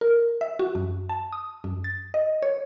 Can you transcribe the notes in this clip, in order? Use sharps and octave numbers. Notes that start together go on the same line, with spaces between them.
A#4
E5
F#4
F#2
A5
D#6
F#2
A6
D#5
C#5